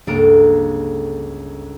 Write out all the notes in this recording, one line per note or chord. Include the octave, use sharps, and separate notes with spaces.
G1 C#2 A#3 A4 A#4 D7